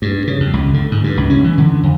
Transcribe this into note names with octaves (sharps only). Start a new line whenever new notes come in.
G2
C#3
F2
C#2
D3
G#2
G2
C#2
C#4
E3
D3
F2